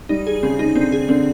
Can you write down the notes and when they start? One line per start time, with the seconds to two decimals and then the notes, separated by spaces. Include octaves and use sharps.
0.09 G3 D#4
0.27 G#4
0.43 C#3 C4
0.59 C#3 D#4
0.75 D3 C4
0.92 G#4
1.09 D3 C4